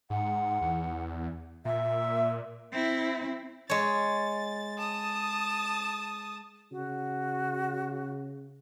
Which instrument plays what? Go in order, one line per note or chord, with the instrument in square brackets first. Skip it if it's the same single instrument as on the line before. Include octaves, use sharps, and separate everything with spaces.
[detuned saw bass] G#2 [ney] F#5
[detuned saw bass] E2
[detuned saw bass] A#2 [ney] E5
[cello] C4 E4
[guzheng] G#3 C#5 [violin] A6
[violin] A5 D#6
[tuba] C#3 [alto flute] F#4